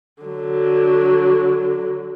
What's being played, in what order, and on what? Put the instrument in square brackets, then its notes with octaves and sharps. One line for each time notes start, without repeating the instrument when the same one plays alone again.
[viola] D3 F#3